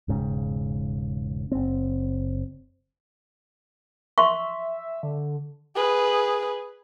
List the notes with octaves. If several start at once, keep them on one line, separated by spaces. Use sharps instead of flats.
E1 G#2 C#3
F#1 C4
E5 C6 C#6
D3
G#4 B4